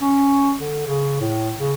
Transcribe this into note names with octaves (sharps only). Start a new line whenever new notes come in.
C#4
D3
C#3
A2
C#3